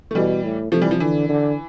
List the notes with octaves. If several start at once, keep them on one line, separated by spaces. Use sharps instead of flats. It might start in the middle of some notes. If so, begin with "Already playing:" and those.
A3
B2 E3 G3
A2
C3 F3 A3
E3 G3
F3
D3 E3
D3